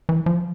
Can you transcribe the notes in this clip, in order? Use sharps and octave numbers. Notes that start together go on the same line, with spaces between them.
E3
F3